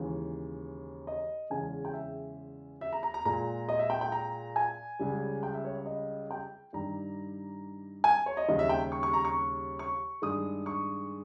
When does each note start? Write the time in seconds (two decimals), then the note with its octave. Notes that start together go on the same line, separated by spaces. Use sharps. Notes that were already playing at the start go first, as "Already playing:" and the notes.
Already playing: D#2 C#3 E3 G#3
1.07 D#5
1.50 E2 C#3 G#3 G#5
1.85 G5
1.93 E5
2.81 E5
2.93 A#5
3.03 A#5
3.14 A#5
3.25 A#2 G#3 A#5
3.69 D#5
3.79 E5
3.90 G5
4.01 G5
4.12 A#5
4.56 G#5
4.99 C#2 C#3 G3
5.43 G5
5.54 E5
5.65 C#5
5.86 D#5
6.31 G5
6.73 G2 D#3 G3 A#5
8.04 G#5
8.26 C#5
8.37 D#5
8.48 D#2 C#3 G3 D#5
8.59 E5
8.69 G5
8.92 C#6
9.03 C#6
9.14 A#5
9.25 C#6
9.79 C#6
10.22 G2 D#3 G#3 D#6
10.66 C#6